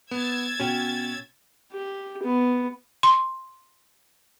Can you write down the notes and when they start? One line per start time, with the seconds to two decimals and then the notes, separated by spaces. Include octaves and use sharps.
0.11 B3 E6 G#6 A6
0.60 B2 C#4 G5 E7
1.72 G4
2.23 B3
3.03 C6